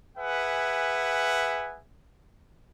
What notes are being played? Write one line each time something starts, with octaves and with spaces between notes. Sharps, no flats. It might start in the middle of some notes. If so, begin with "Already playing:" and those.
G#4 B4 E5 F#5 G#5